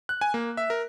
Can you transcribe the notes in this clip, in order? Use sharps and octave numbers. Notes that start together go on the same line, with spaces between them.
F#6
G#5
A#3
E5
A#4